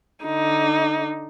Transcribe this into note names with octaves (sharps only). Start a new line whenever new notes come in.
D3 D#4